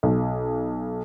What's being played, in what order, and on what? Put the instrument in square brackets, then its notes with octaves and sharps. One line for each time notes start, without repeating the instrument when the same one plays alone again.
[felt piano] B1